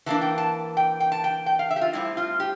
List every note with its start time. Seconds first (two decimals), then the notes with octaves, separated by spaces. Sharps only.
0.06 E3 A#3 D4 A5
0.22 G5
0.38 A5
0.77 G5
1.00 G5
1.12 A5
1.24 G5
1.46 G5
1.59 F5
1.70 E5
1.76 G4
1.81 F4
1.93 A2 G3 C4 E4
2.17 F4
2.40 G4